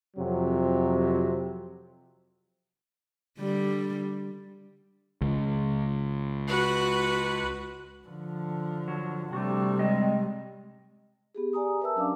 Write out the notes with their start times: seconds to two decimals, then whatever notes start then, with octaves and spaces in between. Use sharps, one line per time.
0.17 F2 C3 F#3
3.39 D3 G3
5.21 C#2
6.48 F#4 B4
8.08 D3 F3
8.88 F#3
9.33 C3 G3 A3 D4 F#4
9.79 G#3 C4 D#5
11.35 B3 G4 G#4
11.53 G4 D5 G#5 A#5 D#6
11.81 A#4 B4 E5 A5 E6
11.96 F#3 C#4 D4 D5 F5 D6